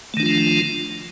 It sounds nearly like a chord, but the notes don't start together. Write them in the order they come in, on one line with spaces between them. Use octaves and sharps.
A3 D#3 D4 F4 F3